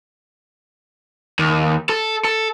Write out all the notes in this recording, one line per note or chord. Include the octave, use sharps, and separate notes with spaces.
D#2
A4
A4